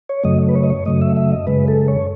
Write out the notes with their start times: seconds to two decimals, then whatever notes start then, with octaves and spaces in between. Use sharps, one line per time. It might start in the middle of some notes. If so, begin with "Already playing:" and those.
0.09 C#5
0.24 F#2 C#3 F#3 A3 D#5
0.49 B4
0.55 C#5
0.64 D#5
0.70 C#5
0.86 F#2 C#3 F#3 A3 D#5
1.02 E5
1.17 E5
1.32 D#5
1.47 F#2 C#3 G#3 B4
1.68 A4
1.88 C#5